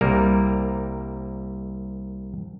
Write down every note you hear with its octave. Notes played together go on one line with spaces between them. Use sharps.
C2 G3 A#3 A#4